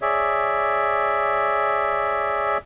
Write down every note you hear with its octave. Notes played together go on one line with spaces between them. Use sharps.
G#4 C#5 D5 E5